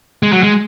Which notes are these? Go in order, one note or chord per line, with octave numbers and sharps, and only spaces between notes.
G#3
F#3
G#3